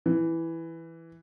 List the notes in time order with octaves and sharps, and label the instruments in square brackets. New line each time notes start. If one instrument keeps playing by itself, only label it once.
[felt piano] E3